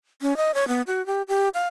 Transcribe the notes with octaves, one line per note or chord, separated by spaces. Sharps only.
C#4
D#5
C#5
B3
F#4
G4
G4
F5